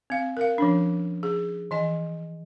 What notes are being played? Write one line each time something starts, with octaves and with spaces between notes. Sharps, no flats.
C4 F5
A#4 F5
F3 C#4 D4
G#4
E3 D#5 G#5